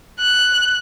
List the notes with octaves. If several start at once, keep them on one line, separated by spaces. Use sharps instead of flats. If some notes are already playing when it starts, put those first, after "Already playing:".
F#6